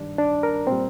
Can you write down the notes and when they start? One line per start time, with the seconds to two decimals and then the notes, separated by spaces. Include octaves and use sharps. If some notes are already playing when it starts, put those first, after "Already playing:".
Already playing: G2 D#3 G3 D4
0.18 D4
0.43 A#4
0.67 A#2 G3 C4